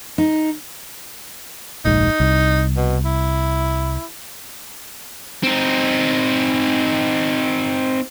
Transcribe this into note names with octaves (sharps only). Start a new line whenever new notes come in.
D#4
F1 A#1 G#2 D#4
C2
B2
E4
C4 D#4